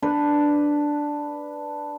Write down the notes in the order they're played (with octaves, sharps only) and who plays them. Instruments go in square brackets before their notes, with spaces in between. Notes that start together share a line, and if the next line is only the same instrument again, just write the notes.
[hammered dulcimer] D4 B4